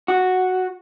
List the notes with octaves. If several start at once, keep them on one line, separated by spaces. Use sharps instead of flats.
F#4